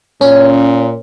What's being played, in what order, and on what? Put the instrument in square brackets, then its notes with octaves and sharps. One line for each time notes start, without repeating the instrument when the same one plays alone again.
[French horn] A#2 [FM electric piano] C#4